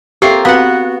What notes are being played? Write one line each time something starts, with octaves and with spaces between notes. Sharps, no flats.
A#3 C4 F4 G4 A4 E5
B3 C4 F#4 F5 F#5